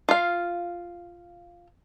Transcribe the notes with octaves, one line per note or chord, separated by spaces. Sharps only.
F4 F5